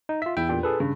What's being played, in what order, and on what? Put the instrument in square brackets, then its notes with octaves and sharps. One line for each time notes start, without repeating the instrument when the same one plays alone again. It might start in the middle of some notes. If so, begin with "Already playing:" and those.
[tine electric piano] D#4
[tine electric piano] F4 E5 [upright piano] B6
[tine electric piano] E2 G5 [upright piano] E4
[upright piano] A#2 D4 G4
[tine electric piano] G#4 A4 B4
[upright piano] G2 [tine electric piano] C#3